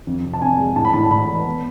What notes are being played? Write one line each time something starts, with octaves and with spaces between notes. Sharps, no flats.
F2
C3
A5
F2 G#5
G#3
A2 A5
B5
A2 A5
A2 B5
E3
B3